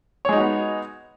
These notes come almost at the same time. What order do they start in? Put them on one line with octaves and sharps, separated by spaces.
C#5 G#3 D#4 F#4 B3